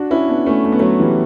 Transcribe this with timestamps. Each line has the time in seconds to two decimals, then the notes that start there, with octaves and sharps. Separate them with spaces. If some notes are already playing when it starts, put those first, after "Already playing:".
Already playing: D4 F#4
0.11 C#4 E4
0.28 B3 D4
0.46 A3 C#4
0.65 A3
0.72 B3
0.79 F#3 A3
1.00 E3 G3